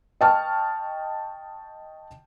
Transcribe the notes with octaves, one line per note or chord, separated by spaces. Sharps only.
D#5 G5 A5 C#6 F6